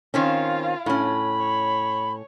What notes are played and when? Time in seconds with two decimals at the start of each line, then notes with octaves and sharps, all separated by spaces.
0.14 D#3 C4 C#4 F4 F5
0.86 A2 C#4 B5
1.39 C#5